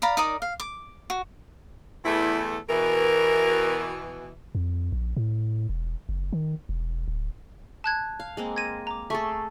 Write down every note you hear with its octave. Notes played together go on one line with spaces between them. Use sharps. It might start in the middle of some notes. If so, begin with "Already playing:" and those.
D5 F5 A#5 B5
D#4 A#4 D5 D#6
F5
D6
F#4
E2 A3 E4
B2 E3 A#4
F2
A#1
A2
E1
F#1
D#3
E1
D1
A5 F#6 G#6
F5
G#3 A#3 C4
G#6 A#6 D#7
A#5 D6
A3 G#4 A4 E5 C#6